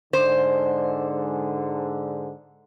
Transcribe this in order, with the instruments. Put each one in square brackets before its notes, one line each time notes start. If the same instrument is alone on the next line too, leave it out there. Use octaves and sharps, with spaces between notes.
[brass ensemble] G#2 D3 [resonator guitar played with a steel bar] C5